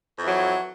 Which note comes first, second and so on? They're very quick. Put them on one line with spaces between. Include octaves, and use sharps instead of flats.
F2 E3 F#3